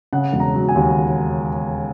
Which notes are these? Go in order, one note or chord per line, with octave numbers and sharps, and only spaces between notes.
C#3 F#5
E1
A#5
F#3
G#5
D#2